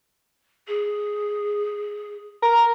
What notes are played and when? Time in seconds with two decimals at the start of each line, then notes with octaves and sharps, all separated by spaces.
0.68 G#4
2.42 A#4